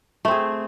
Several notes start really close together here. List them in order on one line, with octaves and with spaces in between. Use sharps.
A3 C4 G#4